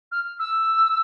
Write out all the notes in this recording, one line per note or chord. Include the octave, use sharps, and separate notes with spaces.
F6
E6